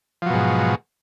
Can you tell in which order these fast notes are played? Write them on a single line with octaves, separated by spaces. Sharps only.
F3 F#3 B2 G#2